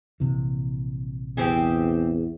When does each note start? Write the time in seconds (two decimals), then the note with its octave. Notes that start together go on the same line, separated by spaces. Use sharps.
0.20 A#1 C3 E3
1.37 E2 C4 G4 G#4